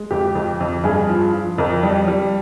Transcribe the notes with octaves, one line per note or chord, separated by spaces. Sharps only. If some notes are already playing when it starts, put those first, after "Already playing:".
Already playing: G#3
F2 G4
F2
F2
G2 G#4
F3
F3
F2 A#4
G3
G3